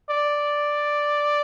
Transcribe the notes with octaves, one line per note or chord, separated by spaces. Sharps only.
D5